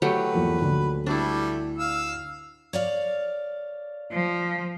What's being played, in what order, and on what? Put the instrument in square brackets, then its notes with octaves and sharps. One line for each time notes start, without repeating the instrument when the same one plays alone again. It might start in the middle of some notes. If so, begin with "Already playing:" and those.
[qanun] F#3 A3 G4 [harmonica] B4
[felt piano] E2 F3 A#3
D2
[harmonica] G3 A3 [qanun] D4 E4
[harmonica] F5 E6
[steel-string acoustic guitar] C#5 D5 F5
[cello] F3